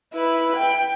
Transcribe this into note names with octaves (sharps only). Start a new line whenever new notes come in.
E4 B4 B5
G5